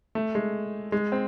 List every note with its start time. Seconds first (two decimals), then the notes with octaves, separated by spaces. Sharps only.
0.15 A3
0.35 G#3
0.92 G#3
1.12 C4